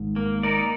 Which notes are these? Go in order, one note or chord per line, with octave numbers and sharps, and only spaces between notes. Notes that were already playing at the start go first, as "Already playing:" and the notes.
Already playing: G#1 G#2
A#3
D#4 A#4 D5